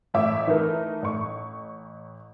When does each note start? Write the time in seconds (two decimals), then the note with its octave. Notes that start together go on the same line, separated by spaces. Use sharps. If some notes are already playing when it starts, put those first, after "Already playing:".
0.14 A1 C#5 E5 D6
0.47 E3 A3 D#4 A#4
1.02 A1 C#6